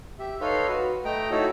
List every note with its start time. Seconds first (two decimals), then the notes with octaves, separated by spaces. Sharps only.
0.19 G4 E5
0.41 D#4 A4 B4 C#5 F5 C6
0.69 F#4 B4
1.05 A3 D#5 G5 A#5
1.31 D#4 E4 F#4 A4 C#5